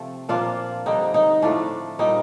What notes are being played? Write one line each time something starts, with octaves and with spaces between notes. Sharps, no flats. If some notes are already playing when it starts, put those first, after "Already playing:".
Already playing: C3 F3 A3 C4 A4
A#2 F3 A#3 D4 F4
D3 G3 C4 D#4
D#4
A2 F3 A3 D4
A#2 G3 C4 D#4